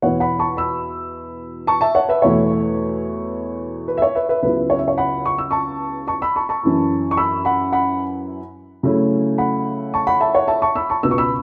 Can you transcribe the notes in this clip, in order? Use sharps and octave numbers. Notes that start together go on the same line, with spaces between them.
E2 B2 B3 E4 C#5 F#5
F#5 B5
A5 C#6
B5 E6
A5 C#6
E5 A5
C#5 F#5
B4 E5
E2 B2 A3 E4 C#5
B4
E5
C#5
B4 E5
B4 E5
C#2 C#3 F#3 B3 E4 B4
C#5
E5
C#5
F#5 B5
C#6
E6
A5 C#6
A5 C#6
B5 E6
A5 C#6
A5 C#6
F#2 E3 C#4 E4
C#6
B5 E6
F#5 B5
F#5 B5
C#3 F#3 A3 C#4 E4
F#5 B5
A5 C#6
F#5 B5
E5 A5
C#5 F#5
E5 A5
A5 C#6
B5 E6
A5 C#6
C#2 B2 B3 E6
C#6
B5 E6